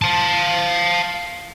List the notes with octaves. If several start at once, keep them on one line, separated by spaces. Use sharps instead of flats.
F5 A5